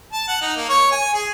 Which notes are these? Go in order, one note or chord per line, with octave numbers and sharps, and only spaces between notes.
A5
F#5
D#4
A#3
C#5
G#5
G#4